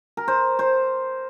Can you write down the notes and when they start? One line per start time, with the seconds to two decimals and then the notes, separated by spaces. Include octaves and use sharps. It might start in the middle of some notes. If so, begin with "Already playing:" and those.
0.17 A#4
0.28 C5
0.59 C5